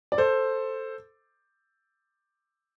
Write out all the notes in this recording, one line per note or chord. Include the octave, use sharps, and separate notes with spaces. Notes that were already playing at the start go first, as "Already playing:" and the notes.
D5
A4 C5